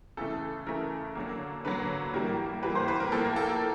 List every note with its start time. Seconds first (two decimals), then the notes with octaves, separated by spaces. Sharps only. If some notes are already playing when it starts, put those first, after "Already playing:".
0.17 C#3 E3 A3 A4
0.67 C#3 E3 A3 A#4
1.15 D3 F#3 A#3
1.65 D3 F#3 A#3 B4
2.13 A2 E3 G3 A#3 A#4
2.63 A2 E3 G3 A#3 B4
2.75 C5
2.88 B4
3.00 A#4
3.12 A2 F3 A#3 A4
3.25 A#4
3.36 A4
3.49 A#4